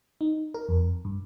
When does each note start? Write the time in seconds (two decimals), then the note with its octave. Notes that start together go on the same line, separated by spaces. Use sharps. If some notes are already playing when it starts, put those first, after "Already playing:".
0.21 D#4
0.54 A#4
0.68 F2
1.05 G2